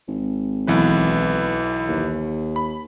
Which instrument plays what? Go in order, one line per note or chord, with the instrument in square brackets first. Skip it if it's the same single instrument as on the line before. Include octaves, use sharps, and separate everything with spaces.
[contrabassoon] G#1
[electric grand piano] B1 E3 B4
[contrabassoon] D#2
[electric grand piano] B5